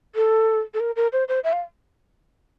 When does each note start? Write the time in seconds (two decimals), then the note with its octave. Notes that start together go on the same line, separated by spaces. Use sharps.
0.15 A4
0.74 A4
0.80 A#4
0.96 A#4
1.13 C5
1.28 C5
1.44 E5
1.53 F5